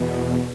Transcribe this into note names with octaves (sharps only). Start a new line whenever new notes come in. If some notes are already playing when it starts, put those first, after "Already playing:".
Already playing: E2 B2